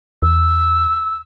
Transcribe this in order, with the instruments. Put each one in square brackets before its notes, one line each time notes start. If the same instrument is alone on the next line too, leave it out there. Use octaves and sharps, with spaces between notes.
[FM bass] E2 [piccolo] E6